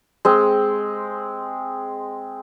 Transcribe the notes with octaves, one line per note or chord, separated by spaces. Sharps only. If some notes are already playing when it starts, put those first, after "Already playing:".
G#3 C4